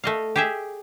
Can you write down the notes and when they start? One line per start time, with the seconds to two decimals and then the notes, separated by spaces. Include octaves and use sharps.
0.04 A3 D#5 F5
0.36 G4 G#4 E5